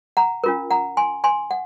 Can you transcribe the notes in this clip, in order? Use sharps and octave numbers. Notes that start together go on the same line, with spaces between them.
F#5 A#5
C#4 F4 A#4
F#5 A#5
G#5 C6
G#5 C6
F#5